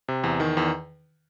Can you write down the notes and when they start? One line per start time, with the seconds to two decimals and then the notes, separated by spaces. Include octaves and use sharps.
0.08 C3
0.24 E2
0.40 D#3
0.57 E2